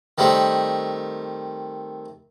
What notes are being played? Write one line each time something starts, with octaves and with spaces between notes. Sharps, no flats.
D#3 G3 A3 C4